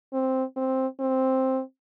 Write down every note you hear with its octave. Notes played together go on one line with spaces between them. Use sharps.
C4
C4
C4